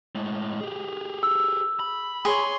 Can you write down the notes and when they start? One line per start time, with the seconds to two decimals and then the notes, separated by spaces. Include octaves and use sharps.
0.15 A2 G#3
0.61 G4 G#4
1.23 E6
1.80 B5
2.25 G#4 C#5 C6